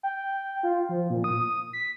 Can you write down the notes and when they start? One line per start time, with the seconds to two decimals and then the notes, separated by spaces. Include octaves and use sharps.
0.03 G5
0.63 F4
0.89 F3
1.10 A#2
1.24 D#6
1.73 B6